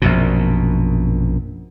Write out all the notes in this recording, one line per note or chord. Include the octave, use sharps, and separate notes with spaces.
A#1 F#2 B2